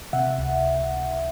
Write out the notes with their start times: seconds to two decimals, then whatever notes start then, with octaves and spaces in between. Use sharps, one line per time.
0.13 C3 E5 F#5
0.38 C#2